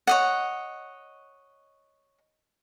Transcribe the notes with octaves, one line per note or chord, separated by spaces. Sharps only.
C#5 D#5 F#5